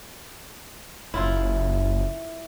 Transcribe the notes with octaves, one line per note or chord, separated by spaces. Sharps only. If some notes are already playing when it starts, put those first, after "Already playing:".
F#1 E4 F4